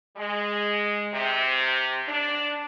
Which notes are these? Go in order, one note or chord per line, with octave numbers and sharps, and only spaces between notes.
G#3
C3
D4